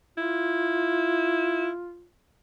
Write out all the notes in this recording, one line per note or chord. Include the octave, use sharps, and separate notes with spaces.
E4 F4